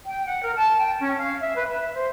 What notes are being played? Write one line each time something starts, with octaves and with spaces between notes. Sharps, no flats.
G5
F#5
A#4
A5
G5
C#4
F5
E5
B4
E5
C5